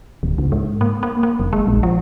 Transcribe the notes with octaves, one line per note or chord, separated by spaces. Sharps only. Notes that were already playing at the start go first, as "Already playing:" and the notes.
D1
C#2
G#2
A#3
A#3
A#3
F1
G#3
A#1
F3